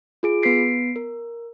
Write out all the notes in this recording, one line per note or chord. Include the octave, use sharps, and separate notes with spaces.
F4 G#4 D7
B3 B4 B6 C7 D7
A#4